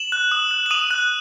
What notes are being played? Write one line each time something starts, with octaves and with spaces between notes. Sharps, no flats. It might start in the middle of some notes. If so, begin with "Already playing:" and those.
Already playing: E7 F#7
F#6
D#6
F#6
F#7
D#6 D#7 F7
F#6